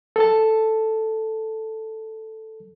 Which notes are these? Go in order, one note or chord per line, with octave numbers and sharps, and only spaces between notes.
A4 A5